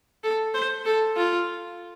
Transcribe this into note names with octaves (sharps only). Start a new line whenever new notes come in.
A4
C5
A4
F4